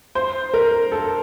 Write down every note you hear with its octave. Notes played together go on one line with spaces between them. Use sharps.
C5
A#4
A4